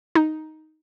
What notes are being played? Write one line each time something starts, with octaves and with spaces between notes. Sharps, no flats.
D#4